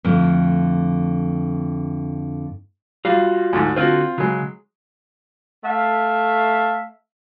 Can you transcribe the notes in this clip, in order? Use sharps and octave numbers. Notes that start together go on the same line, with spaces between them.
F2 A2 D3
G3 F4 F#4 F5
D2 G#2
D3 C4 F4 F#4
C#3 F#3 G#3
A3 A4 E5 F5